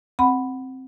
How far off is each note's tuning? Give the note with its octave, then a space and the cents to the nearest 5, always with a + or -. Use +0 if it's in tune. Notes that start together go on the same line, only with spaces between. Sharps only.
C4 +0 F#5 +0 B5 +0